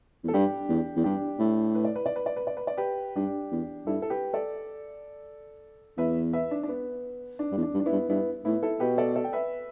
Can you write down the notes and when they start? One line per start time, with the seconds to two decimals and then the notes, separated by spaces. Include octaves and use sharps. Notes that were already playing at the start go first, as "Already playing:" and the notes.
0.24 E2
0.28 A4
0.34 G2 D4 G4
0.69 E2
0.96 E2
1.04 G2 D4 G4
1.39 A2
1.75 B4
1.85 D5
1.96 B4
2.06 D5
2.16 B4
2.26 D5
2.36 B4
2.47 D5
2.57 B4
2.67 D5
2.77 G4 B4
3.16 G2 D4 G4
3.52 E2
3.86 G2 E4 A4
4.02 A4
4.10 G4 B4
4.33 A4 D5
5.97 E2 B4 E5
6.33 B4 E5
6.51 D4
6.63 D4
6.69 B3
7.39 D4
7.52 G2
7.57 E2
7.63 D4
7.74 G2
7.80 D4
7.86 B3 E4
7.92 G2
8.09 G2 B3 E4
8.45 A2 B3 E4
8.63 E4 A4
8.80 B2 G4 B4
8.98 A4 D5
9.15 A4 D5
9.24 G5
9.33 B4 E5